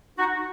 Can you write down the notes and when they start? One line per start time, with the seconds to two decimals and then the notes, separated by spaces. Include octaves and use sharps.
0.17 D#4 F#4